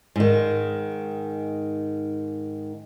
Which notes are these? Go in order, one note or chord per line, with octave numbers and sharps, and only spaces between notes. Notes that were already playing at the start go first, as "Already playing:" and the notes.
G#2 D#3